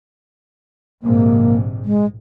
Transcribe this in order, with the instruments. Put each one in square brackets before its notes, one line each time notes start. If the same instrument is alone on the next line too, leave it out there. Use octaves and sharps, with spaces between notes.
[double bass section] A#1 G#2 C3 [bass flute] A#3
[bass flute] G#3